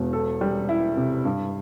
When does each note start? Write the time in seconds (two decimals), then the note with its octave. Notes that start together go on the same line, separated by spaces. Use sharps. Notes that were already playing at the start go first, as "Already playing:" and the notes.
Already playing: E1 E2
0.13 A4
0.41 G3
0.69 E4
0.97 C3
1.25 G2